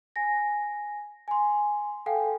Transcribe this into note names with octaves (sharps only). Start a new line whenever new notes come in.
G#5 A#6
G#5 C6
A4 F5 G5 G#5